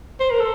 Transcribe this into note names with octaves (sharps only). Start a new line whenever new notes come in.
C5
A#4
A4